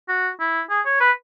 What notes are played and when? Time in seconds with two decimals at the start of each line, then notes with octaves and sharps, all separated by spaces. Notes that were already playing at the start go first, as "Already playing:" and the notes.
0.09 F#4
0.40 E4
0.70 G#4
0.85 C#5
1.00 B4